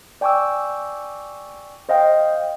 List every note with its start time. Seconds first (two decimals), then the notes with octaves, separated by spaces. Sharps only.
0.21 D5 G5 G#5 C#6 D6 E6
1.89 C5 D#5 F5 G5